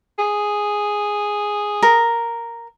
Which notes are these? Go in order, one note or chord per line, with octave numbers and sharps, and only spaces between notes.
G#4
A#4